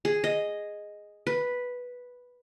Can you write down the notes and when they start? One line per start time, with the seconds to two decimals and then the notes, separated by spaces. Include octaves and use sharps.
0.05 G#4
0.24 D#5
1.27 B4